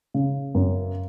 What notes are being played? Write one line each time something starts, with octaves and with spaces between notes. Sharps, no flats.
C#3
F#2